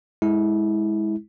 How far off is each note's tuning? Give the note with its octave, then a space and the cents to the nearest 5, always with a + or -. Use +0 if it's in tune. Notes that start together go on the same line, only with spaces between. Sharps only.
G#3 +0 E4 -25